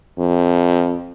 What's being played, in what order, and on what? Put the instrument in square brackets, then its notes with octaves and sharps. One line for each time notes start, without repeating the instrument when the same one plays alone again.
[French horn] F2